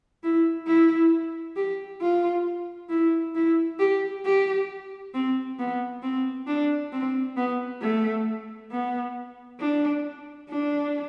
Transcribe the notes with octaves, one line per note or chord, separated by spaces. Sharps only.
E4
E4
G4
F4
E4
E4
G4
G4
C4
B3
C4
D4
C4
B3
A3
B3
D4
D4